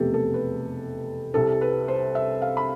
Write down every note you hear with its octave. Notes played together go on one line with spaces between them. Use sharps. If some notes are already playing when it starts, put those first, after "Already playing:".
Already playing: F1 E2 B2 A3 C4 G4 A4
A4
B4
C2 C3 G3 C4 A4
B4
C5
E5
F5
B5